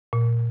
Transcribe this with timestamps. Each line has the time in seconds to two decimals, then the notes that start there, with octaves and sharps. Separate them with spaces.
0.13 A#2